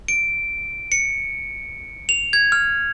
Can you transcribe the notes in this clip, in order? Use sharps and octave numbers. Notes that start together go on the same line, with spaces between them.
D7
C#7
F7
G#6
F6